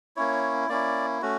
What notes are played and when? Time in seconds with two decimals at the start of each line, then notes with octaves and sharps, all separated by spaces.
0.16 A#3 C#4 E4 C#5
0.69 A#3 C#4 E4 D5
1.22 A3 C#4 F#4